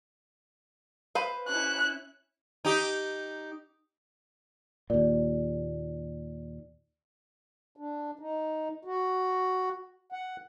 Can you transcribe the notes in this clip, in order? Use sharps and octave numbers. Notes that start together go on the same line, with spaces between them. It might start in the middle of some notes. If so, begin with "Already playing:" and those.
B4 C5 F5
C#4 E4 F#6
D#4 G4
D#2 A#2 D5
D4
D#4
F#4
F#5